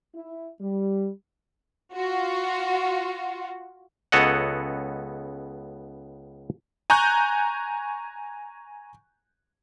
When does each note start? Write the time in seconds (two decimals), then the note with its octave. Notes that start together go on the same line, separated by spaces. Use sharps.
0.15 E4
0.61 G3
1.94 F4 F#4
4.12 C#2 B3 A4 C#5 D#5 F#5
6.90 G#5 A#5 C#6 F#6 G6